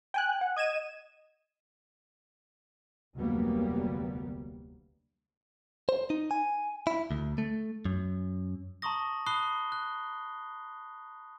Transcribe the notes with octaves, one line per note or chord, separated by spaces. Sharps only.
G5 G#5 F#6
F#5
D#5 G#6 D#7 E7
F1 D2 F#3 G3 A#3 B3
C5
D#4
G#5
E4
D2
A3
F#2
A5 A#5 C6 C#6 D#6 A#6
A5 B5 D#6 F#6 C7 G7
F#6